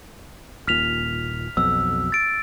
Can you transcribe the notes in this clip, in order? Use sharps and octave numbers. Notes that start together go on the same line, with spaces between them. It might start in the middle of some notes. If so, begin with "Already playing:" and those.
D#1 A#2 F6 B6 F7
B1 F2 B2 E6
A6 D7